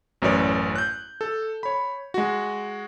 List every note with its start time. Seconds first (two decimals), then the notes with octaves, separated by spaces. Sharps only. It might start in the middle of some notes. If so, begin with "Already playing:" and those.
0.22 A1 F#2 B4 C#5 D5
0.75 F#6 G6
1.21 A4
1.63 C#5 B5
2.14 G#3 F#4